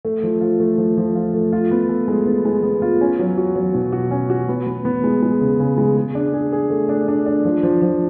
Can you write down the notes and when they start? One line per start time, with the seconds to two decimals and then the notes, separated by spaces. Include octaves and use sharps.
0.05 A3
0.23 F3
0.41 F4
0.60 A3
0.78 F3
0.97 F3
1.15 F4
1.34 A3
1.52 F4
1.71 B3
1.89 A4
2.08 G#3
2.26 B3
2.45 G#3
2.63 B3
2.82 F4
3.01 C#4
3.19 F#3
3.37 F#4
3.56 F#3
3.74 B2
3.92 F#4
4.11 C#4
4.30 F#4
4.49 B3
4.67 B3
4.85 B3
5.04 G#3
5.23 G#3
5.41 C#3
5.60 C#3
5.78 G#3
5.97 G#4
6.15 D4
6.33 G#4
6.53 G#4
6.70 A3
6.89 D4
7.08 D4
7.26 D4
7.45 F3
7.63 F3
7.82 F3